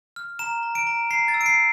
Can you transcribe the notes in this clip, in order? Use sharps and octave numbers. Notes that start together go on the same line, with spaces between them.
F6
A#5 E7
A#5
D7
A#5
A#5 C7
A6
E6
D7
C7